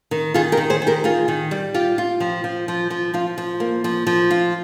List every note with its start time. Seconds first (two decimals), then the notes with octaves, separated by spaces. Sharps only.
0.11 D#3
0.34 D#3 F4 G#4
0.52 G4 A#4
0.57 D#3
0.70 G#4 C5
0.82 D#3
0.87 G4 A#4
1.04 D#3 F4 G#4
1.28 D#3
1.51 G3
1.74 F4 G4
1.98 F4
2.20 F3
2.44 F3
2.68 F3
2.90 F3
3.14 F3 F4
3.38 F3
3.60 A#3
3.84 F3
4.07 F3
4.31 F4